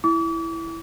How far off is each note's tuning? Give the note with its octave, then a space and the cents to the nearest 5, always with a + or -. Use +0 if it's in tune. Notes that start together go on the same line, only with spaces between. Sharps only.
E4 +0 D6 -40